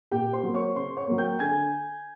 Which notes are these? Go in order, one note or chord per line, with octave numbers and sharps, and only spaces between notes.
A#2 G4 G5
C5 C6
F#3 A#3
C#5 C#6
C#3 C5 C6
C#5 C#6
F#3 A#3
G5 G6
D3 G#5 G#6